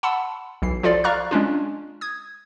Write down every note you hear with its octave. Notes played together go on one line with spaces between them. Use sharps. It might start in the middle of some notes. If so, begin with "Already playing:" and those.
F#5 A5 B5 C6 E6
B1 E3 C7
F3 F4 A4 D5
D5 F5 A#5 C#6 F6 F#6
G#3 C#4 D4 F4
D#6 G#6